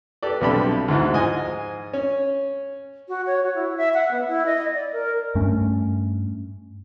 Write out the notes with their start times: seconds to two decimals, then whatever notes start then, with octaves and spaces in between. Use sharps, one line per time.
0.23 G4 A4 B4 D5
0.41 B1 G2 C3 G4 A4 B5
0.88 D2 G#2 D#4 E4 F#5
1.12 G#2 F3 D#5 G#5
1.94 C#4
3.08 F#4
3.27 C#5
3.43 F#4
3.55 E4
3.77 E5
3.94 F#5
4.11 B3
4.28 E4
4.46 D#5
4.74 D5
4.93 A#4
5.35 G2 A3 C#4